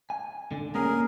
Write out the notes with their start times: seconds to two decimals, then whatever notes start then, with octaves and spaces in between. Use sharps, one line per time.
0.10 G#5
0.51 D3
0.75 A#3 C#4 G#4 A#4